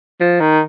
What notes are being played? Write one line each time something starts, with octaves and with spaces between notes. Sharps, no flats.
F3
D#3